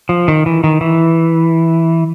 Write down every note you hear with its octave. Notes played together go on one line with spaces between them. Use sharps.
F3
D#3
E3
D#3
E3